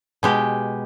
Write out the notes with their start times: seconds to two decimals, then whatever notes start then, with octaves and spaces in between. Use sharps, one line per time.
0.23 B2 G#3 G4